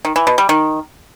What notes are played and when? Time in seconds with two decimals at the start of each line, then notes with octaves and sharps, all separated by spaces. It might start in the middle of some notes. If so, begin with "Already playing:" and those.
0.05 D#3
0.16 E3
0.27 B2
0.38 G3
0.49 D#3